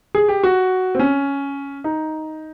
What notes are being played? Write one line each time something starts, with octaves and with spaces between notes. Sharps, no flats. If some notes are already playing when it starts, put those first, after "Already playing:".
G#4
G4
F#4
C4
C#4
D#4